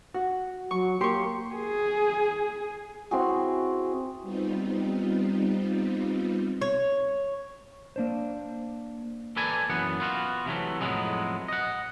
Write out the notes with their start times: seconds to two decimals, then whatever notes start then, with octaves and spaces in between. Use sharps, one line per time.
0.14 F#4
0.71 F#3 C#6
1.01 A#3 G4 C6 C#6
1.55 G#4
3.11 C4 E4 F#4 G#4
4.22 G3 B3 C4 D#4 F4
6.61 C#5
7.96 A#3 D4 C5
9.36 A#3 A4 B4 D5 G#5
9.70 F#2 E3 B3 F#5
10.00 B3 F4 F#4
10.46 C3 E3 F#3 A3
10.81 F2 A2 F#3 G#3 B3
11.48 D#5 F#5